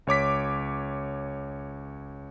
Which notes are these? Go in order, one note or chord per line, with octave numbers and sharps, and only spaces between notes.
C#2 C#5 D6 B6